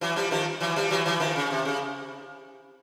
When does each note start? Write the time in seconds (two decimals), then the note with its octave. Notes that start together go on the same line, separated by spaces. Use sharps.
0.01 E3 F#3
0.16 F3 G3
0.31 D#3 F3
0.60 E3 F#3
0.76 F3 G3
0.90 E3 F#3
1.06 E3 F#3
1.20 D#3 F3
1.36 C#3
1.50 C3
1.65 C#3